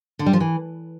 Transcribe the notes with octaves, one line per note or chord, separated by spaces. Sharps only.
D3
G3
F3
E3